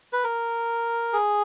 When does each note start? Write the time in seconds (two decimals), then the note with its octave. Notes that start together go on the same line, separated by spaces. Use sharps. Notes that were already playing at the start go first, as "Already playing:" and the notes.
0.13 B4
0.24 A#4
1.13 G#4